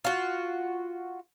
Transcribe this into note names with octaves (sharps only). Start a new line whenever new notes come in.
F4 F#4